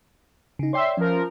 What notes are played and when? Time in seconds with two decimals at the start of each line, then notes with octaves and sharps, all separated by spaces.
0.59 C#3 D#4
0.73 C#5 D5 E5 G5 C6
0.97 F3 C#4 A#4